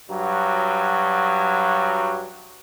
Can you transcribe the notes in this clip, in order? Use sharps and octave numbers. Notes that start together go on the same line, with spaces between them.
G2 F#3